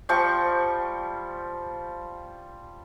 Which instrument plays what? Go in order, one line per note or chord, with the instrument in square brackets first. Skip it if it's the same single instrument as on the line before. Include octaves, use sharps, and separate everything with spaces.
[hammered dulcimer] F3 G3 G5 C#6